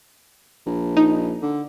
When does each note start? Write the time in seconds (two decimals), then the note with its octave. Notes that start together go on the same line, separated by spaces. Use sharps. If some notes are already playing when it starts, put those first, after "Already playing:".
0.66 A#1
0.97 D#4
1.42 D3